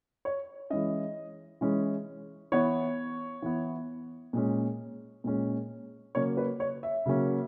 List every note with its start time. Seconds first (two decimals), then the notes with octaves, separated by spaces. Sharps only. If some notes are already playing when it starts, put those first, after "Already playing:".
0.25 C#5
0.70 E3 G#3 C#4 D#5
1.61 E3 G#3 C#4
2.52 E3 B3 C#5
3.42 E3 B3
4.33 A#2 G#3 C#4
5.24 A#2 G#3 C#4
6.15 C#3 F#3 A#3 C#4 C#5
6.37 B4
6.60 C#5
6.83 E5
7.06 C#3 F#3 A#3 C#4